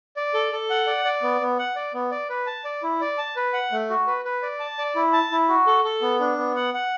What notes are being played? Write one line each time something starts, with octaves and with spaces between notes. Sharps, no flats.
D5
A4
A4
F#5
D5
D5
B3
B3
F#5
D5
B3
D5
B4
A5
D5
E4
D5
A5
B4
F#5
A3
F#4
B4
B4
D5
A5
D5
E4
A5
E4
F#4
A4
A4
B3
D4
B3
F#5
F#5